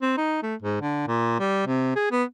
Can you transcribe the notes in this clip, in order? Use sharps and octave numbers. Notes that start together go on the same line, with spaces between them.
C4
D#4
A3
G#2
D3
A#2
G3
C3
G#4
B3